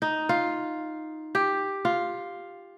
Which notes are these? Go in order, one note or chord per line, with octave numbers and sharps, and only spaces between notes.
D#4
F4
G4
F4